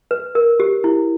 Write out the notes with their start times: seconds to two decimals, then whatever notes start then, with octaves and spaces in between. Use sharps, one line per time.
0.11 B4
0.35 A#4
0.60 G4
0.84 E4